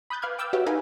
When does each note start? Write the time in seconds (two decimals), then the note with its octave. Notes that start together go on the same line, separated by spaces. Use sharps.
0.10 B5 D#6 F#6 G6 A6
0.22 B4 F5 D6 F6 F#6 G#6
0.38 G5 D6 E6 F6 G6 A6
0.53 F#4 G4 B4 C#5 E5 F#5
0.66 D#4 A#4 B4 F5 G#5 B5